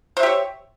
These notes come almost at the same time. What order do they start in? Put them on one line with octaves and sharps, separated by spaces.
C5 E5 G4 C#5